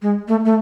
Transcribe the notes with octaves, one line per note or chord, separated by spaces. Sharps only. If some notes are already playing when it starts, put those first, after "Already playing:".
G#3
A3
A3